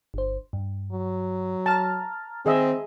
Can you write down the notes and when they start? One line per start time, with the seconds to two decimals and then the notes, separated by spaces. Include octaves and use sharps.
0.14 G1 C5
0.53 G2
0.92 F#3
1.66 A5 A#5 F6 A6
2.46 D#3 C4 G#4 D#5 E5